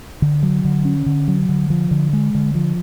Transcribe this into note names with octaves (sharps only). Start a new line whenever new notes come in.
D3
F#3
D3
C#4
D3
F#3
D3
F3
D3
G#3
D3
F3